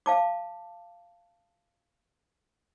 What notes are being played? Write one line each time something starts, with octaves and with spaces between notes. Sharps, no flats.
F5 A5 D6